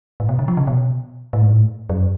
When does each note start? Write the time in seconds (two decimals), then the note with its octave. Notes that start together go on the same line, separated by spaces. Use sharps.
0.20 A2
0.29 B2
0.39 D3
0.48 F3
0.57 C#3
0.67 B2
1.33 A2
1.42 G#2
1.49 A2
1.89 F#2